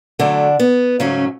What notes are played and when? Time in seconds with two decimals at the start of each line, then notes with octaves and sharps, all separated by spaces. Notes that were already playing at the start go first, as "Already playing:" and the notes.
0.19 A2 D3 F#3 A3 D4
0.60 B3
0.99 G#2 C#3 F#3 A3 C#4